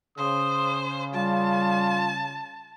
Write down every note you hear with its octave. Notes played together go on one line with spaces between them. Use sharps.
C#3 C5 D#6
G3 F4 A5